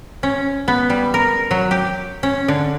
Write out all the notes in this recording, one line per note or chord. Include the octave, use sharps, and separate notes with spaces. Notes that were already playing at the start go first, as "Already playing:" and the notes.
C#4
B3
G3
A#4
F#3
G4
C#4
D3